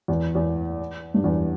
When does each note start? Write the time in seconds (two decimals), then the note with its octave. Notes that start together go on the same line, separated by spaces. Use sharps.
0.08 E2
0.35 E2
1.14 G2
1.24 E2